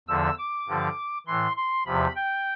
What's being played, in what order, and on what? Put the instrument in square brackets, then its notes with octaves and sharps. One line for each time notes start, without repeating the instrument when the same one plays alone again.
[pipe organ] E2 D3 F3 E6
D6
G2 D3 F3
A2 E3 C6
C6
E2 C3 F3 B5
G5